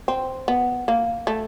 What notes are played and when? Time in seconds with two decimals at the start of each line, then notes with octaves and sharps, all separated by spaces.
0.08 C4
0.48 B3
0.88 A#3
1.27 A3